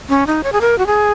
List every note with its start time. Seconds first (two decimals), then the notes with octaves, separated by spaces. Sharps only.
0.09 C#4
0.27 D#4
0.43 C#5
0.53 G#4
0.61 A#4
0.78 F#4
0.87 G#4